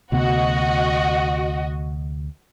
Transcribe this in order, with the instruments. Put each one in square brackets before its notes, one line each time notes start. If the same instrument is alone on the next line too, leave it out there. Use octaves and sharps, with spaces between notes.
[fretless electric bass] D2 C3 B3 [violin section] F#4 D#5